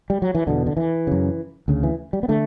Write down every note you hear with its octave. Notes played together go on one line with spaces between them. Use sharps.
G3
F#3
E3
E2 B2 D3
D3
E3
F#2 C#3
D2 C#3
E3
G3
B3
D3 A3